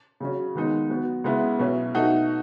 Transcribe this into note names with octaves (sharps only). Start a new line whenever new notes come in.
C#3 F#3 C#4
D#3 G#3 B3 D#4
F#3 B3 F#4
C#3 G#3 B3 E4
B2 F#3 C#4 E4
B2 A3 D#4 F#4